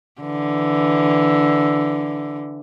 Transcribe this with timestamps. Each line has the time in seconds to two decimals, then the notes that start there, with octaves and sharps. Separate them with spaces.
0.22 D3 E3